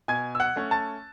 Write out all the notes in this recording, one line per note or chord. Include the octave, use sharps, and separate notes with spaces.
B2 G#5 G#6
E6
F#5 F#6
A3 C#4
A5 A6